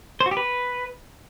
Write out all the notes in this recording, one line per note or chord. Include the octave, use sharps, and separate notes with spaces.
C5
F#4
G4
B4